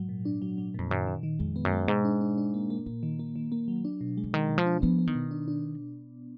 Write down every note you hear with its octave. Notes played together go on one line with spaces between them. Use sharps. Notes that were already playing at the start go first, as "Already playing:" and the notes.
Already playing: G#2 F#3
A#2
D4
F#3
F#3
F2 A#2
F#2 D#3
D#3
D#3
F2 G#3
B3
F#2
G#3
G#2 B2
D4
D4
D4
A#3
A#3
A#2 A#3
D#3
A#3
D#3
A#3
F#3
D4
B2
G#3
D3
D#3 G#3
B2
F3
D4
F3 B3
B3
D#3
B2
D4
D4